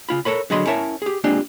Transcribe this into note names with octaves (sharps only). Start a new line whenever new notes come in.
C#3 F4 B5
A4 A#4 C#5 B5
D3 F#3 G#4 D#5 B5 C6
C#4 E4 A#4 C#5 E5 A5
G4 G#4
G#3 A#3 C4 D4 F4 G4